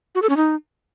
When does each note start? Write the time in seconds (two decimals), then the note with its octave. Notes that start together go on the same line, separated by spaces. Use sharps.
0.15 F#4
0.22 A4
0.29 C#4
0.37 D#4